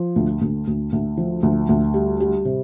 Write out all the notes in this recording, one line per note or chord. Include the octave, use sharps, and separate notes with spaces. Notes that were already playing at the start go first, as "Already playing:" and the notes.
Already playing: F3
D2
D2
D2
D2
F3
D2
D2
G3
G3
C3